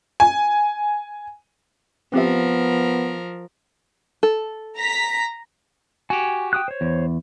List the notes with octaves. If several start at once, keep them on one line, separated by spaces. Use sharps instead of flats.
G#5
F3 B3 C4 G4 A#4 E5
A4
A#5 B6
F#4 G4 G#5
G5 D#6 F#6
C5 C#5
E2